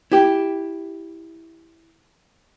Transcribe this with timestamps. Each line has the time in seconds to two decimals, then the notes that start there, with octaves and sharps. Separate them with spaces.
0.12 E4 G4